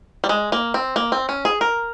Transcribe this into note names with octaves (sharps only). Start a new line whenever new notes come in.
G3
G#3
A#3
C4
A#3
C4
C#4
G#4
A#4